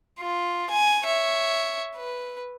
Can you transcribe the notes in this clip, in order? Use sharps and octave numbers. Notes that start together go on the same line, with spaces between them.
F4
G#5
C#5 E5
B4